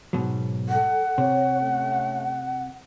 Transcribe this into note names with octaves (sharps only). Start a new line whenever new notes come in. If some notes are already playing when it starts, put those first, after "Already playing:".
G#2 B2 F#3
A4 F#5
C3 C#5
A3 C#4